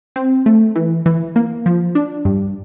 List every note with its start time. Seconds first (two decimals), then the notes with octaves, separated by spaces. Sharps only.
0.16 C4
0.46 A3
0.76 E3
1.06 E3
1.36 A#3
1.66 F3
1.95 D4
2.25 G2